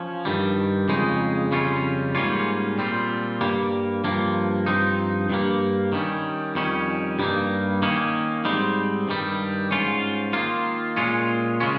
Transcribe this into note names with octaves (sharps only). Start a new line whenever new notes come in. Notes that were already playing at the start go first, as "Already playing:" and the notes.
Already playing: F3 C#4
G2 D#3 G3
F2 C#3 G#3 D#4
F2 C#3 G3 C#4 F4
G#2 G3 A#3 C#4 F4
A#2 G3 C4 F4
G2 G3 A#3
G2 F3 A#3
G2 F3 C4 D#4
G2 G3 A#3
D#3 G3 C#4
F2 D#3 G3 C#4
G2 G3 A#3 D#4
D#3 A#3 C#4
G#2 G3 C4 D#4
G2 D#3 G3
G#2 G3 C#4 F4
D#3 A#3 F4
A#2 G#3 C#4 F4
C#3 G#3 C#4 F4